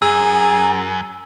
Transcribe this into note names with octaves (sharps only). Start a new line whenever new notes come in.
F#2 G#4 E6